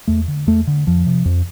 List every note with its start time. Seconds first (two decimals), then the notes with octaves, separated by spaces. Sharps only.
0.07 E2 A3
0.28 D3
0.47 E2 A3
0.67 D3
0.87 F2 F3
1.06 C3
1.25 F2